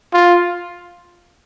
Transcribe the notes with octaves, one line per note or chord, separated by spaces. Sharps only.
F4